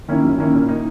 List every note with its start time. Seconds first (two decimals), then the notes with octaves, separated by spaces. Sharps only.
0.08 D#3 A#3 C#4 E4
0.24 F#2
0.38 D#3 A#3 C#4 E4
0.53 A#2
0.69 A#3 D#4